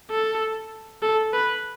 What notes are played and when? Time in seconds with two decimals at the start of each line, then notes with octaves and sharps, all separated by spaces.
0.10 A4
1.02 A4
1.33 B4